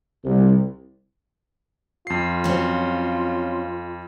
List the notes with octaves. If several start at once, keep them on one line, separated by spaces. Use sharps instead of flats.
C2
F2 F4 C7
F#3 C4 C#4